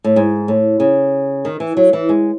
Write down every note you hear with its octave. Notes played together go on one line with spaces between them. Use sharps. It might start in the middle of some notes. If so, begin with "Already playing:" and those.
A2
G#2
A2
C#3
D#3
E3
F#3
E3
G#3